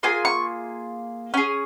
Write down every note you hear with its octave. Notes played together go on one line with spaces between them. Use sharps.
A#3 F4 G#4 G#5
C#6
C#4 G#4 G#5